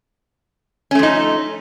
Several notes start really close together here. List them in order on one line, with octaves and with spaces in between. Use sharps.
C#4 A3 F3 D#4